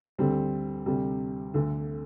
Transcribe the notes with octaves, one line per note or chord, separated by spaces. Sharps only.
D2 D3 G3 C4
D2 C3 G3
D2 D3 A3